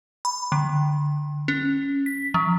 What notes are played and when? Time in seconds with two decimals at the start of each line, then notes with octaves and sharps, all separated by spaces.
0.25 B5
0.52 D3
1.48 C#4
2.06 B6
2.34 F3